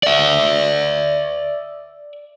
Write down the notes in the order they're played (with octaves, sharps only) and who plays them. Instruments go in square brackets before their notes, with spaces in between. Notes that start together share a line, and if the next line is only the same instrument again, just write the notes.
[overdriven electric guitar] D5 E5